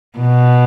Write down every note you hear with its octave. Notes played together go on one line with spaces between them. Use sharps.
B2